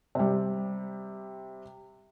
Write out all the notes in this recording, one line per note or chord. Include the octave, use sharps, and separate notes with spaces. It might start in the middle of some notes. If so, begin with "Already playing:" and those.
C3 G3